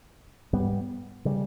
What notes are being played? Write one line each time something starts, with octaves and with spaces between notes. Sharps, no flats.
G#2 G3 B3
C#3 G3